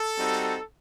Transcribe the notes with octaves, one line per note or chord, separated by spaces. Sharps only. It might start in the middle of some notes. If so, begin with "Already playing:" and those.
Already playing: A4
G3 C4 D#4 F#4